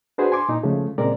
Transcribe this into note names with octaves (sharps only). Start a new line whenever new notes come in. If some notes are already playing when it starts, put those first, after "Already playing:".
D4 F#4 G#4 B4 C5
G#5 C6 D6
A#2 D#4
C#3 F3 G#3 A3
A#2 C#3 G#3 C4 A#4 D5